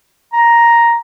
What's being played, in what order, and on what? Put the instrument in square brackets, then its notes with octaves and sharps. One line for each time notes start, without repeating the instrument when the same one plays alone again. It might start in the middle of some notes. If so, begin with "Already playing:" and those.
[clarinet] A#5